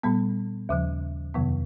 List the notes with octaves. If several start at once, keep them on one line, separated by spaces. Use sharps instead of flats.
A#2 G3 B3
D#2 C#3 F3
F2 C3 D#3 F#3 B3